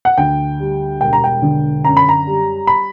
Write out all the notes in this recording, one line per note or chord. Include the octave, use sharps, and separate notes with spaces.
F#5
D2 G5
G3
E1 G5
A#5
G5
D3
F#2 A#5
B5
A#5
G3
B5